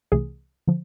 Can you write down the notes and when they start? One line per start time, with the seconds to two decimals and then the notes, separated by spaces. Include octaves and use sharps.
0.12 C2 C3 E3 A3 G#4
0.67 D3 F3